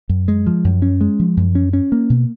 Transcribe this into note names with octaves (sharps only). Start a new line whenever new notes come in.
F#2
G#3
F3
F#2
C#4
G#3
F3
F#2
C#4
C#4
A#3
B2